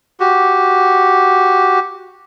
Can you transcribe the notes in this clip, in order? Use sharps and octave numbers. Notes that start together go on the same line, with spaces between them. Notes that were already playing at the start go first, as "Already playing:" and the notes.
F#4 G4